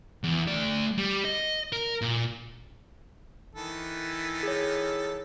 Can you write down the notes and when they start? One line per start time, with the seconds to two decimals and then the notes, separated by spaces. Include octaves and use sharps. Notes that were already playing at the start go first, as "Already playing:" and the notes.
0.24 E2
0.47 A3 D5
0.98 G3
1.25 D#5
1.73 A#4
2.01 A#2
3.55 D#3 E3 A4
4.43 G#4 C#5